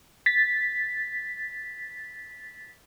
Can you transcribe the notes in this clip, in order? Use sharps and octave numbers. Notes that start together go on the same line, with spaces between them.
A6 B6